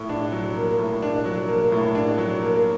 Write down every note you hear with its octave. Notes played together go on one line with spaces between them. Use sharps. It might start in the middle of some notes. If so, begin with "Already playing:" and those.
Already playing: A2
D4
F#3
A#3
A2
D4
F#3
A#3
A2
D4
F#3
A#3